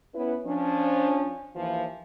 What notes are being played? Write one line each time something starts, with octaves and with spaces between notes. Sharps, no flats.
B3 C#4 E4 B4
F3 C#4 D4
D#2 E3 F3